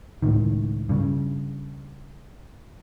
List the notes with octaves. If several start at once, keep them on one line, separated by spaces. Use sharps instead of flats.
C#2 A2 D#3
G2 C#3